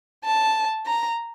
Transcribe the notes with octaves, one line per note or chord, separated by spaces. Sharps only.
A5
A#5